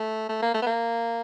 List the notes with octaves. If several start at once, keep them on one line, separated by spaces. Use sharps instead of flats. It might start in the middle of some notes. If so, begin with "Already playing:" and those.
Already playing: A3
A3
A#3
A3
B3
A#3